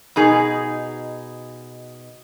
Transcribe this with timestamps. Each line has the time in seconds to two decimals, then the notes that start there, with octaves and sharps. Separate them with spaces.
0.16 B2 D#4 G#4